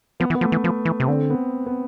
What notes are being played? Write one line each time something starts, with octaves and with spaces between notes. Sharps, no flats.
F3 B3
E3
B3
F3 A3
E3
F3 B3
E3
C3
D3 C4
B3
B3